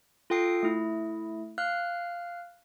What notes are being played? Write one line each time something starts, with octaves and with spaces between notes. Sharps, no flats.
F4 A4 G5 D#6 C7
A3 E4
F5 F6 F#6